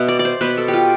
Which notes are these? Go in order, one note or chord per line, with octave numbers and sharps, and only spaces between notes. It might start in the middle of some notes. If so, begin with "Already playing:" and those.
Already playing: B2 B3 E5
D5
D5
C5
B2 B3 B4
A4
G4
F4